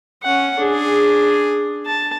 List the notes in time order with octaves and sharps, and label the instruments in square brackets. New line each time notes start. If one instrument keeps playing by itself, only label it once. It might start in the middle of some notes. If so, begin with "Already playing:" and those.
[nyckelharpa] C#4 F#5
[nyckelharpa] D4 [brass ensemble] G#4
[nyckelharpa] A5